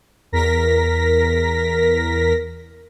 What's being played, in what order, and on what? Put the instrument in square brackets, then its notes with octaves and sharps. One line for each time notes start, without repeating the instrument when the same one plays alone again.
[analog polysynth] E2 A#4 A#6 B6